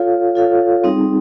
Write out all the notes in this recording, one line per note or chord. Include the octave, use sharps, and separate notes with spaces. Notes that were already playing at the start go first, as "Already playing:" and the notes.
Already playing: F4 A4 C#5 F5
F4 A4 C#5 F5
G3 C4 D#4 G#4